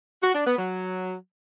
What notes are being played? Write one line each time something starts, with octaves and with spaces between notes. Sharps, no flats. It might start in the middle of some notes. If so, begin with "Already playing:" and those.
F#4
D4
B3
F#3